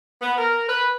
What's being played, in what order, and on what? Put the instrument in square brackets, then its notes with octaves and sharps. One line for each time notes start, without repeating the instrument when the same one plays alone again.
[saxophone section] B3
A#4
B4